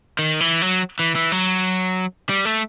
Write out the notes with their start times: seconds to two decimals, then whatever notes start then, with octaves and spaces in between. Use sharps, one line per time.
0.19 D#3
0.40 E3
0.62 F#3
0.99 E3
1.16 E3
1.32 F#3
2.29 G3
2.45 A3